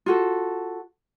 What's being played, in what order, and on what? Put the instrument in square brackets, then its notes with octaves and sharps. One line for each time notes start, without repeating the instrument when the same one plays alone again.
[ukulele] F4 F#4 A4